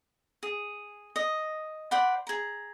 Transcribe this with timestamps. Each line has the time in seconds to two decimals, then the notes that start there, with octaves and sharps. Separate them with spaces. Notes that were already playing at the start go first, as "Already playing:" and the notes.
0.43 G#4
1.16 D#5
1.91 C5 D5 F#5 B5
2.27 G#4 A#5